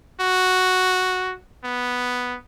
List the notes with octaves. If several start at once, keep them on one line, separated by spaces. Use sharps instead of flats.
F#4
B3